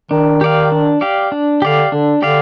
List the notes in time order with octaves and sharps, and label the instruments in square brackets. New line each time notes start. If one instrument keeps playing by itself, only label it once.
[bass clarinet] D#3 [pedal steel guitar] D4
[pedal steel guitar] G4 D5 F5
D4
G4 D5 F5
D4
[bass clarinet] D3 [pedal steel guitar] G4 D5 F5
[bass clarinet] D3 [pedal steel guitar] D4
[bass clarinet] D3 [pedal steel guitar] G4 D5 F5